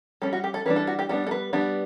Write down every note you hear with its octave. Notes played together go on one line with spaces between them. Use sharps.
G3 C#4 A4
F#4
G4
A4
E3 G3 D4 B4
A4
F#4
G4
G3 B3 D4 A4
A4
B4
G3 B3 D4